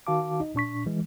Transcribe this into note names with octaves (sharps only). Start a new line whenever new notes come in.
D#3 F#4 F5 A5 D6
D#4 D#5
A#2 D4 C#6 B6
E3 G#3